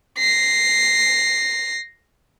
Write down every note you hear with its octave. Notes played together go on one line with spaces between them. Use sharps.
A#6 C7